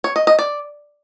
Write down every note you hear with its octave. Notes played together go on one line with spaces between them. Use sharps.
C#5
D#5
D#5
D5